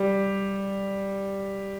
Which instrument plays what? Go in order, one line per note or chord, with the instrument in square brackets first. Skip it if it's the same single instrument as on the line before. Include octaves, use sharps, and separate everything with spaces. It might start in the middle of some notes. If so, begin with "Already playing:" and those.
Already playing: [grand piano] G3